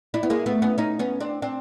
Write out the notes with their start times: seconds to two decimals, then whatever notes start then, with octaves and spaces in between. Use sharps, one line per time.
0.14 D4 E4
0.23 B3
0.30 G#3 A#3
0.46 A3 B3
0.62 B3 C#4
0.78 C#4 D#4
0.99 B3 C#4
1.20 C4 D4
1.42 C4 D4